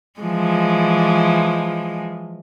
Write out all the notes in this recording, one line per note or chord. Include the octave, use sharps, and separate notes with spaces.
E3 F3 G#3